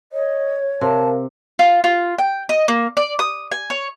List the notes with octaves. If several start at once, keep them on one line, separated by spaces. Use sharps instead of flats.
C#5 D#5
C3 A#4 F5 A5
F4
F4
G5
D#5
A#3
D5
D#6
G#5
C#5